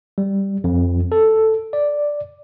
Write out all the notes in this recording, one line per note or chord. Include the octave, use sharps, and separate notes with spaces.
G3
F2
A4
D5